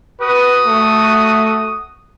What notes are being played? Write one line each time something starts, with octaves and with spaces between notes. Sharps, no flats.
F#4 B4 D#6
A3